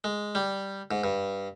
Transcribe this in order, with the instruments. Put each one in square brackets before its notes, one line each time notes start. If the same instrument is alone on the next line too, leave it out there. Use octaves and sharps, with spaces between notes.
[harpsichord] G#3
G3
G#2
G2